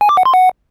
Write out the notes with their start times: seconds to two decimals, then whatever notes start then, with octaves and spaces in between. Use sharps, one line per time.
0.01 G#5
0.09 D6
0.17 F#5
0.25 C6
0.34 F#5